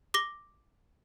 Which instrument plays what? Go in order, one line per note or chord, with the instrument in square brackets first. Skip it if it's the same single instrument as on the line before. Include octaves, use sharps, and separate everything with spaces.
[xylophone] D6 A#6 G7